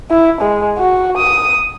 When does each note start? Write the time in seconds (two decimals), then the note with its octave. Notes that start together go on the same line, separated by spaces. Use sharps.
0.11 E4
0.41 G#3
0.78 F#4
1.17 D#6